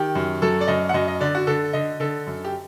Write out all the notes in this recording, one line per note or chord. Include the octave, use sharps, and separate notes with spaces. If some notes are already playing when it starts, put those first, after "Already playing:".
Already playing: D#3 G4
F#2
F#3 A4
D5
F#2 D#5
F#5
F#2 D#5
D#5
D3 D5
F#4
D3 A4
D3 D#5
D3 A4
F#2
G4